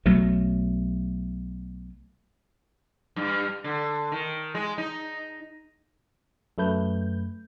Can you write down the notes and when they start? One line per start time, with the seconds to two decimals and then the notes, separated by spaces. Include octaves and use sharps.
0.06 B1 F#3 A3
3.16 G2
3.64 D3
4.12 D#3
4.55 G#3
4.78 D#4
6.58 F#2 A3 B4 G6